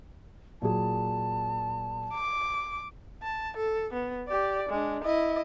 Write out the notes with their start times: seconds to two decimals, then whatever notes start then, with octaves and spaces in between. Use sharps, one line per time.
0.62 A#2 F#3 G#4 A5
2.14 D6
3.22 A5
3.57 A4
3.93 B3
4.28 G4 D5
4.69 G#3 D4
5.04 E4 D#5